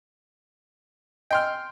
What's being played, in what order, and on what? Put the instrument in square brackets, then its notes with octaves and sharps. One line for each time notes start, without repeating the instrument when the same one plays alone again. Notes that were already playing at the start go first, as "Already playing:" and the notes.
[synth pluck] D#5 G#5 E6 [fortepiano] G5 C6 F6